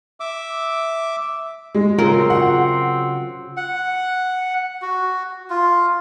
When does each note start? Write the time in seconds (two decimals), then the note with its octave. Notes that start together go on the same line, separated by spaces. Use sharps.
0.20 E5 D6
1.75 G#3
1.98 C#3 F#3 C4 F4 A#4
2.30 F#5
3.57 F#5
4.82 F#4
5.50 F4